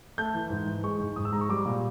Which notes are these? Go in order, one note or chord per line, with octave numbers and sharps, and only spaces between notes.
A3 G6
E3
G#2
E3
G#3 C#6
G#2
G#2 D#6
E6
G#3 A#5
C#6
G3 D6
A#2